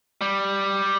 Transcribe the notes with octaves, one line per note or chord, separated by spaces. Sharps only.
G3